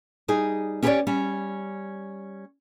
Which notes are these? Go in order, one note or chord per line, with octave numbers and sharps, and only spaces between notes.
G3 D#4 G#4
C#4 G4 G#4 B4 C#5 D5
G3 C#4